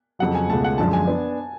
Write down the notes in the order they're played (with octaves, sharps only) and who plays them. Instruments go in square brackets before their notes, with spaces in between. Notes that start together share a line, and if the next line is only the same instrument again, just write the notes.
[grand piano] F2 C#3 F#3 [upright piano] F#5
[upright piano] G#5
[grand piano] C#2 B2 A3 [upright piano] A5
[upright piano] F#5
[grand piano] F#2 D3 F3 G#3 D4 [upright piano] A5
[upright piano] G#5
[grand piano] B3 D4